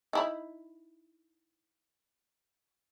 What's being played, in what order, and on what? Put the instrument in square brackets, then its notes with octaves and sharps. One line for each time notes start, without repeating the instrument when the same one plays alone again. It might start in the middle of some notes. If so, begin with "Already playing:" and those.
[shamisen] D#4 E4 B5